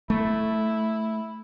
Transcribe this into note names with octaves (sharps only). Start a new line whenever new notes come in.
A3 E4